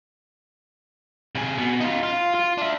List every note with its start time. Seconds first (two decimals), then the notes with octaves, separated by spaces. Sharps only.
1.35 C3 G#4
1.58 B2
1.80 D#4 F4
2.03 F4
2.35 F4
2.58 D4 E5